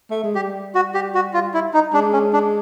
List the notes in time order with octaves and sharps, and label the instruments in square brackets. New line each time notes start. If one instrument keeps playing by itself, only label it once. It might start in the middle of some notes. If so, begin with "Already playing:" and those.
[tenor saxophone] A3
G#3
[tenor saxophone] G3 [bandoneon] G4
[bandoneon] F#4
G4
F#4
F4
E4
D#4
[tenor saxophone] G#3 [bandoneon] D4
[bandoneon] C#4
D4